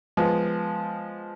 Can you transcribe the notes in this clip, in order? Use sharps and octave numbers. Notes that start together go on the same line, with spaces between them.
F3 G#3 B3